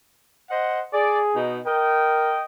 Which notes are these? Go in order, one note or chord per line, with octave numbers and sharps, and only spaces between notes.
C5 D#5 F#5
G#4 D5
B2 D#4
A#4 D#5 G5